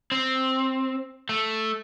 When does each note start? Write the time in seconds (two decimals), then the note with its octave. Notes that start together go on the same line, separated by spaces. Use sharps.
0.12 C4
1.29 A3